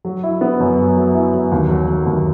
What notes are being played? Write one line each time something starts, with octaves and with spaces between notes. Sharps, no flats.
F#3
E4
B3
F#2
F#3
F#3
E4
F#3
D#2
F#3
F#3
D#2